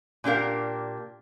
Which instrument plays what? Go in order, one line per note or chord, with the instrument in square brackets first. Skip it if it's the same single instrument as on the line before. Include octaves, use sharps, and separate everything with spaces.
[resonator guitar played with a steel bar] A#2 D4 G4 A#4 F5